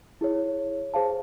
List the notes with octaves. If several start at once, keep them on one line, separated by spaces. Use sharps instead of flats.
E4 G#4 C#5
G#4 C5 F5 A5